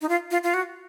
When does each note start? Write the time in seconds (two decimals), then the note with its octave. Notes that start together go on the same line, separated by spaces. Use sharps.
0.01 D#4
0.09 F4
0.31 F4
0.43 F4
0.54 F#4